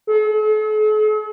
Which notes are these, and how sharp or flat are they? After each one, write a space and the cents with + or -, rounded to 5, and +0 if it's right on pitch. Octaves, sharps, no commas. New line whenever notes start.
A4 -45